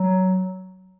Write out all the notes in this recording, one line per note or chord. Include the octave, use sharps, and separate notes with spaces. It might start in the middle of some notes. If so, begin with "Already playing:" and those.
Already playing: F#3